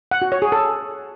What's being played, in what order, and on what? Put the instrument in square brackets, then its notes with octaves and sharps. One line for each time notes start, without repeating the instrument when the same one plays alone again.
[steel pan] F#5
F#4
C#5
G#4
A4